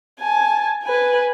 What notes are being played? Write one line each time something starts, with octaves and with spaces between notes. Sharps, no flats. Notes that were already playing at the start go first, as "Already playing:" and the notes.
G#5 A5
B4 G#5